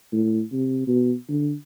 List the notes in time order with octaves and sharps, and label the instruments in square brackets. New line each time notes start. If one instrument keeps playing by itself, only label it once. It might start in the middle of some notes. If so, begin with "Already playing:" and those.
[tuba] A2
C3
B2
D3